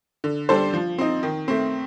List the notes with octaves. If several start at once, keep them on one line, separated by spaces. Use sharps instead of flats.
D3
G3 D4 A4 C5
F3
C4 D#4
D#3
A3 C4